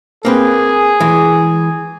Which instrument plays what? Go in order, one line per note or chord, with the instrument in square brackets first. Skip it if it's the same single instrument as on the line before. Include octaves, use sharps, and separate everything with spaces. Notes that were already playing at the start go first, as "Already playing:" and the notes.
[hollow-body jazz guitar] A#3 C4 B4 [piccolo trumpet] G#4
[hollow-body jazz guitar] E3 G#3